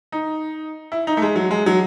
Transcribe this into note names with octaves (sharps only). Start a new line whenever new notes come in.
D#4
E4
D#4
A3
G#3
F#3
G#3
F#3